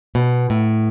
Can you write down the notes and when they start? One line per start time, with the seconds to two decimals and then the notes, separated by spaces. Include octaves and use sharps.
0.15 B2
0.50 A2